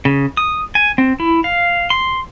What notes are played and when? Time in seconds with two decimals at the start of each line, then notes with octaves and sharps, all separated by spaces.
0.05 C#3
0.37 D#6
0.75 G#5
0.98 C4
1.20 E4
1.44 F5
1.90 C6